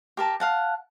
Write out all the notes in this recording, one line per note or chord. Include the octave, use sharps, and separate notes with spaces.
G4 A#4 A5
F5 F#5 A5